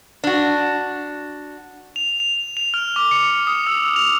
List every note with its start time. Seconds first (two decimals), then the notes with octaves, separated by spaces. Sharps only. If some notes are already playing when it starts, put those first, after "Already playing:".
0.24 D4 F#4
1.96 F7
2.20 F7
2.57 F7
2.74 F6
2.96 D6
3.11 C#7
3.47 D#6
3.67 E6
3.96 F7